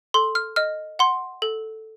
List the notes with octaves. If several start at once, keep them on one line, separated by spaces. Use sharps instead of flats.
A4 C6
F6
D#5 F6
F#5 C6
A4